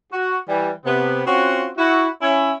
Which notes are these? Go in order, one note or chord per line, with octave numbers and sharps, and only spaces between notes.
F#4
E3 G3
C3 B3
C4 C#4 F4 F#4
E4 F#4
C#4 E4